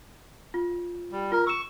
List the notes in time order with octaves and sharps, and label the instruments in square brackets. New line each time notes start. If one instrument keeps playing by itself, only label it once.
[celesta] F4
[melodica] G3
[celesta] F4 [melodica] A#4
[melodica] C#6 [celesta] E6 E7